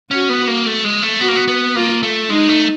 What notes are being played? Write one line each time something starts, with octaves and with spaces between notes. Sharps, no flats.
C#4 F#4
B3
A#3
A3
G#3
A3
B3 F#4
A#3
B3
B3
A#3 F4
A3
G#3 D#4
A3